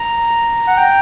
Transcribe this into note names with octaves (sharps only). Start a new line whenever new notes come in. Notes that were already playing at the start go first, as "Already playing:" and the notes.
Already playing: A#5
F#5
G5